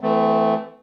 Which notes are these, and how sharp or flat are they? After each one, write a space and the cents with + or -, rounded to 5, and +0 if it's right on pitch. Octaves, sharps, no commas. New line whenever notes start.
E3 +0 A3 +0 C4 -40